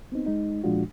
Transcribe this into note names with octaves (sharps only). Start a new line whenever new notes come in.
B3 C4 D#4
G#3 D#4
A#2 F3 G#3 D4 F4 F#4